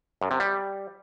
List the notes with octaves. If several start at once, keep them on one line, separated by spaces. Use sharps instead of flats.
F#2
C3
G3